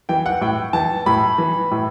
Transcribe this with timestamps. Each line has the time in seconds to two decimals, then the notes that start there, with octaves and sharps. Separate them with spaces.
0.09 E3 G5
0.26 F#5
0.41 A2 G5
0.73 E3 A5
1.06 A2 B5
1.38 E3
1.71 A2